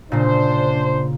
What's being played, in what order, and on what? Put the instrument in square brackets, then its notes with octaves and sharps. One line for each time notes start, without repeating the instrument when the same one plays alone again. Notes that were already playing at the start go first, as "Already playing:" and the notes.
[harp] A#2 C#3 [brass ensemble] D4 C5